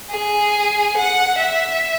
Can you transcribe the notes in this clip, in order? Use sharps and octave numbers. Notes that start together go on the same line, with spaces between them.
G#4
F#5
E5